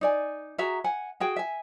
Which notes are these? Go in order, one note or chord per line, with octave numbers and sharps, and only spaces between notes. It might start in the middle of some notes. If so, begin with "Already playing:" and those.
D#4 D5 G#5
F#4 G#4 E5 A#5
F#5 G#5
F#4 G#4 G5
E5 G#5